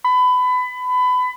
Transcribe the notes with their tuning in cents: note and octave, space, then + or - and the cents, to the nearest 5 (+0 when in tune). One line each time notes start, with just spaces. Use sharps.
B5 +25